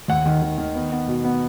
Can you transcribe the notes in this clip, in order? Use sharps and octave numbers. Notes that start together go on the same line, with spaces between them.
D#2 F#5
D#3
D#3
D#3
B3
B3
B2
B3